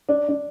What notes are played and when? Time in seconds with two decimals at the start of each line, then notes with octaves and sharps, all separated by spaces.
0.09 D4
0.29 D4